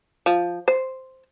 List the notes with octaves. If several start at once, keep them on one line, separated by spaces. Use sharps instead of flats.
F3
C5